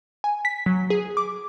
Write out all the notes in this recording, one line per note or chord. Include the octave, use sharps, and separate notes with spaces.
G#5
B6
F#3
G#4
D6